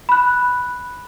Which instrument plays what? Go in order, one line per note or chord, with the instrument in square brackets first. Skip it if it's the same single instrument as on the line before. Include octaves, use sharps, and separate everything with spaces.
[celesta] B5 F#6